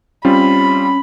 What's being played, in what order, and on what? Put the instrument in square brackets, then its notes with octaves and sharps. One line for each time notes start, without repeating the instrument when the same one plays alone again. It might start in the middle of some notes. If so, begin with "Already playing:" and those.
[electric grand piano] G3 C4 F4 [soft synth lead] C#4 [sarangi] B5